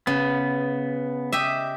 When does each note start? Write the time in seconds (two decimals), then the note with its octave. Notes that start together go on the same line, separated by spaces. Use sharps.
0.07 C#3 B3
1.32 G4 D#5 E5